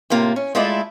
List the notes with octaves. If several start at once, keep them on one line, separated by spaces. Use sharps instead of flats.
A2 C3 A#3 F4
C#4
G#3 A3 E4 F4 A4 D5